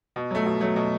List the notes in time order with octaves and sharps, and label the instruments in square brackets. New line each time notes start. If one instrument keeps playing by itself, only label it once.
[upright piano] B2
F#3 A3
B2
F#3 A3
B2